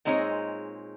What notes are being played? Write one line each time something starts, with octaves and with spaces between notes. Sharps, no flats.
A#2 G#3 C4 D#4 G#4 C#5